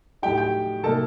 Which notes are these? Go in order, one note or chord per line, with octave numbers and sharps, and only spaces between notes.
A2 F#3 A3 D#4 G4 G5
G4 G5
C3 F#3 A#3 D#4 A4 A5